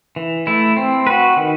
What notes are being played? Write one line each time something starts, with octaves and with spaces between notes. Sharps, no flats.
E3
A3 E4
C4
F#4 B4
D#3